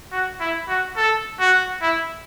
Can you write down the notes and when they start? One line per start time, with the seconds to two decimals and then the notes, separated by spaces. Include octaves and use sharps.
0.12 F#4
0.41 E4
0.68 F#4
0.97 A4
1.40 F#4
1.82 E4